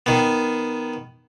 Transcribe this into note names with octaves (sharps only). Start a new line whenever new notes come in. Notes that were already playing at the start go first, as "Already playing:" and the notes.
D#3 B3